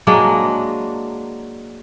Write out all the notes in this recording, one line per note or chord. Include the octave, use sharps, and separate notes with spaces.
F#3 G#3 A#3 D4